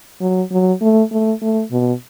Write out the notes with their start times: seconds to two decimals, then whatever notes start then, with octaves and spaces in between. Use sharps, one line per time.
0.21 F#3
0.51 F#3
0.81 A3
1.11 A3
1.42 A3
1.72 B2